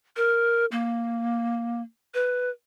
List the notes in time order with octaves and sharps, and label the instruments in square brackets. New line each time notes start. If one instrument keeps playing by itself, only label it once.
[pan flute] A#4
A#3
B4